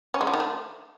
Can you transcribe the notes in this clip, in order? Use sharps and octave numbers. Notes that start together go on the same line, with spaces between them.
C#4
G#3
F3
D#3
A3